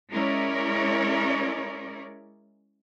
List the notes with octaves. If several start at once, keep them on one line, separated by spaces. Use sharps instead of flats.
G#3 C#4 E4 A#4 C#5 D5